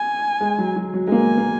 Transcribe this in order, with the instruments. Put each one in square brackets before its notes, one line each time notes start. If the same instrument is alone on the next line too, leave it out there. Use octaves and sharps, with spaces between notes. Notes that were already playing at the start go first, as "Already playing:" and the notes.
Already playing: [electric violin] G#5
[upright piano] G#3
F#3
F#3
F#3
G#3
[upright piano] A#3 [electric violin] G#5
[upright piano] A#3